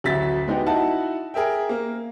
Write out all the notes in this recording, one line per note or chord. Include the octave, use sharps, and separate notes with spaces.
A1 D2 F#3 E5 A6 B6
G#3 B3 D#4 F#4 G4
D#4 E4 F#4 F#5 A5
G#4 A#4 E5 G5
A#3